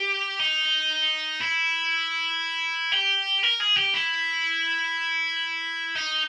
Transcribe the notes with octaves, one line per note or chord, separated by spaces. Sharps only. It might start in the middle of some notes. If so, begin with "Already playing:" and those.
Already playing: G4
D#4
E4
G4
A#4
G#4
G4
E4
D#4